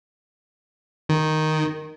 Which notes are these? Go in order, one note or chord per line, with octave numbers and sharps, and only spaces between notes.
D#3